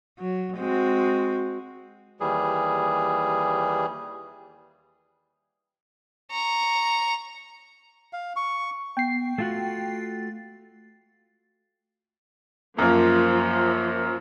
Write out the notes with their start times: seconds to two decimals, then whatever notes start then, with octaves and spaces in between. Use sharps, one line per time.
0.19 F#3
0.57 G#3 C4 F#4
2.20 D#2 E3 G3 G#4
6.31 A#5 C#6
8.13 F5
8.36 C#6
8.97 B3 G5 C7
9.38 A3 F4 F#4 A6
12.79 F#2 F3 A#3